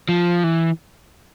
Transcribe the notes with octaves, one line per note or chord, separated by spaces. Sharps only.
F3
E3